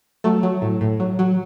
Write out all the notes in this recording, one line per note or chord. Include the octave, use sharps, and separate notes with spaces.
F#3 A3
F#3
A2
A2
F#3
F#3